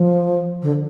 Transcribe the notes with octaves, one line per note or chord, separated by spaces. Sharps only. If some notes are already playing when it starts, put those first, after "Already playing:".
Already playing: F3
D3